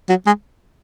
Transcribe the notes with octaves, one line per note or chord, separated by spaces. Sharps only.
F#3
G#3